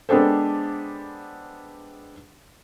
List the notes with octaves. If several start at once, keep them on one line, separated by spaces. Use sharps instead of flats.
G#3 B3 D4 G4 A4 C5